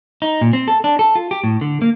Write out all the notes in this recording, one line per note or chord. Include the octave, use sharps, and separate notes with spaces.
D#4
A#2
C4
A4
D4
A4
F4
G4
A2
D3
A#3